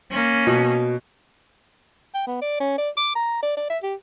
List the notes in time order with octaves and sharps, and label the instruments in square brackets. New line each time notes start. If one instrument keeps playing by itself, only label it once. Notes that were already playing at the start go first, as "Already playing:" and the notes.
[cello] A#3 C#4
[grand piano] B2
[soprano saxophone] G5
B3
D5
C#4
D5
D6
A#5
D5
D5
E5
G4